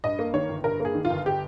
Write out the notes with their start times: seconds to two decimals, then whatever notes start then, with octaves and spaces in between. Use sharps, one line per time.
0.04 G2 D#5
0.19 A#3
0.34 D#3 C#5
0.49 G1
0.64 G2 A#4
0.80 A#3 G#4
0.95 D#3
1.05 F4
1.10 G1
1.26 G4